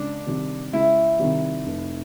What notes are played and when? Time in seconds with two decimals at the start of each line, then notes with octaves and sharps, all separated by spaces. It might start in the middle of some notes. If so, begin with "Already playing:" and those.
Already playing: C#2 D4
0.26 C3 D#3 G3
0.73 C#2 E4
1.19 C3 D#3 G3
1.66 F1